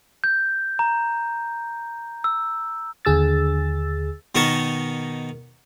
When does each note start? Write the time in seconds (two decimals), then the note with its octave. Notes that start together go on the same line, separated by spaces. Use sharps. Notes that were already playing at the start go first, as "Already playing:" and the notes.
0.24 G6
0.79 A#5
2.24 E6
3.05 D#2 D3 G#4 E6 A6
4.35 B2 D#3 D#4 A#4 A5 C#6